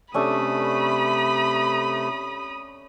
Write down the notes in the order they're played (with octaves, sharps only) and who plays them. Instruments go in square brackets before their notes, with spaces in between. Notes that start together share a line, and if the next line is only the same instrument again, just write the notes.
[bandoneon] C3 A3 [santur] C#4 D4 A4 [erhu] B5 [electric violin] D#6